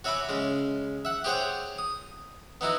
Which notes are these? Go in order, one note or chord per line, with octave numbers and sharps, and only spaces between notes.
F#4 C#5 E5 G#5 B5 D6
C#3 G#3
E5 F#5
G4 G#4 C5 C#5 F#5 G5
D#6
B3 D#4 E4 F#4